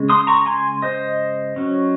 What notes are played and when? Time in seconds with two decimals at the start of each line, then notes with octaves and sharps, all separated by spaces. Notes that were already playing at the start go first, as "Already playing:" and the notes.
Already playing: C#3 G#3 C#4
0.10 C6 D#6
0.27 A#5 C#6
0.46 G#5 C6
0.82 C5 D#5
1.56 F#3 C#4